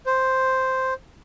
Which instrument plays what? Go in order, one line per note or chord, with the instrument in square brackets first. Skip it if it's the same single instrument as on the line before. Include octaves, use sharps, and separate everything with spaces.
[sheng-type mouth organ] C5